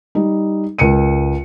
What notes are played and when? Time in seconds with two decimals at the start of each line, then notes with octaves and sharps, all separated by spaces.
0.15 G3 D#4
0.79 C#2 A#4 C#7 D#7